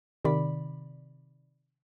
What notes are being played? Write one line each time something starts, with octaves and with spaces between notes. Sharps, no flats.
C3 D#3 D5 B5